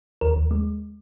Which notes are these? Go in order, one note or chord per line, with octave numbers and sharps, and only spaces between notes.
D#2 A#4
D#2
G#3